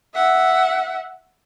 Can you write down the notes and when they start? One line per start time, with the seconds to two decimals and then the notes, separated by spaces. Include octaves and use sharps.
0.15 E5 F#5